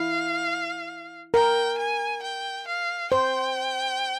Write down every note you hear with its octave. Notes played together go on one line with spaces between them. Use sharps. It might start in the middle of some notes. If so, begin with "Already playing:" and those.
Already playing: E4 F5
A#4 G5
G#5
G5
F5
C5 G5